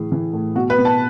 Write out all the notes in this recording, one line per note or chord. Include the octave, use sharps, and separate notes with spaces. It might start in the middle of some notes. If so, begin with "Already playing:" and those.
Already playing: A2 E3 G#4
E3
A2
B2 F#4
B4
B2
A5